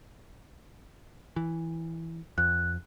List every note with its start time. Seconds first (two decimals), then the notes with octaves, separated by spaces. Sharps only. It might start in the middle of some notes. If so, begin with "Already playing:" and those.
1.36 E3
2.38 F2 F#6